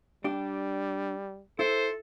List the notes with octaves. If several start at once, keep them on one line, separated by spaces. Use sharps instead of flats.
G3 D4 G4
E4 A4 C5